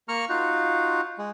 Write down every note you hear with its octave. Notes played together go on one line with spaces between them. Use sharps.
A#3 A#5 C#6 F6
D#4 F4 F#4
G#3